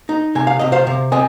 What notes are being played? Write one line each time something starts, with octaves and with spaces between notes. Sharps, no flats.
D#4
C3 G#5
F5
C3 D#5
C5 F5
C3
C4 D#5 G#5